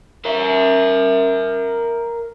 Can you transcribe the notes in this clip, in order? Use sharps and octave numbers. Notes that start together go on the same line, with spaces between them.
A#4 E5